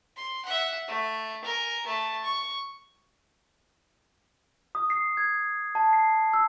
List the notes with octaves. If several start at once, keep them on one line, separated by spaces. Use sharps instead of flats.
C6
E5 F#5
A3
A#4 G#5
A3 A5
C#6
D#6
C7
G#6
A5
C7
E6